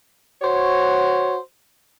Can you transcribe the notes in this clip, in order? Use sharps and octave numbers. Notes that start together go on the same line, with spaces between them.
F#4 C5 C#5